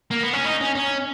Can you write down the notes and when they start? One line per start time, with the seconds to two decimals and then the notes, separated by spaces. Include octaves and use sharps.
0.11 A#3
0.23 B3
0.33 C#4
0.45 D#4
0.61 C#4
0.75 C#4